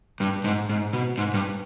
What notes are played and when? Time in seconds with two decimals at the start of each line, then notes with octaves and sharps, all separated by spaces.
0.20 G2
0.44 G#2
0.69 G#2
0.93 B2
1.18 G#2
1.34 G2